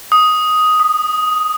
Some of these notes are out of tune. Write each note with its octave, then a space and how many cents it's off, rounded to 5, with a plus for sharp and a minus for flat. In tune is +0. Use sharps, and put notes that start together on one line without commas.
D#6 +5
D#6 -25